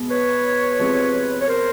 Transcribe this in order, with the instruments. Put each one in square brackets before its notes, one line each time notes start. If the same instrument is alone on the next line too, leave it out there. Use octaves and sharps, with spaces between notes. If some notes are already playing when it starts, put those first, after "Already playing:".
Already playing: [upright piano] B2 G#3 B3
[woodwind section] B4 C#5
[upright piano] C3 F3 G#3 C4
[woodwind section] C#5
A#4 C5